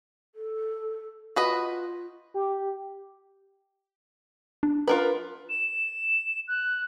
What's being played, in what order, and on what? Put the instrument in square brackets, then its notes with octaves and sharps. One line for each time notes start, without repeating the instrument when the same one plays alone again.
[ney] A4
[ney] F4 [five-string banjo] F#4 B4 D#5
[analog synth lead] G4
[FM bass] D4
[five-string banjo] F4 A#4 B4
[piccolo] E7
F#6